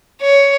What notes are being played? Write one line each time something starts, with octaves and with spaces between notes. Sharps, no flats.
C#5